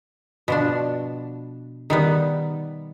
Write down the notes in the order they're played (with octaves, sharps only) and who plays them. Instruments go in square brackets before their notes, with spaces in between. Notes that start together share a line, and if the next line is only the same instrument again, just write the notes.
[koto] B2 F3 D4
D#3 G3 B3